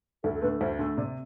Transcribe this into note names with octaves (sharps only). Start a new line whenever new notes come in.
D2 A4
A4
D3 A3 B4
D2 C5
D3 A3
C3 D5